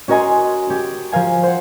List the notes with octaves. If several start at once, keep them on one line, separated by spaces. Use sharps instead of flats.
C#4 F#4 A#4 D#5 G#5 C6
C#4 G4
F3 A#4 F5 G#5
C5 F#5